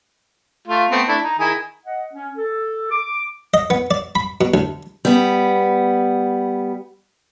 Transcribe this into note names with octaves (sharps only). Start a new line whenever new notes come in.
A3 F4
A3 B3 C4
A3 D4 E4
D#4
D#3 E4 G#4
D#5 F#5
C#4
A4
D6
D#5
B3
D5
B5
B2
D2
G3 B3